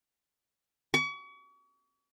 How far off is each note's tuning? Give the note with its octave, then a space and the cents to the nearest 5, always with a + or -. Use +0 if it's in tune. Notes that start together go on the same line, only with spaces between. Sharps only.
C#6 +40